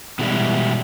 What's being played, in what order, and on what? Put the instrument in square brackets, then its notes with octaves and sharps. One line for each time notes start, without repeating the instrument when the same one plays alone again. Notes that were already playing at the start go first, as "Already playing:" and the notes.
[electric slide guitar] B2 E3 G3 G#3 E4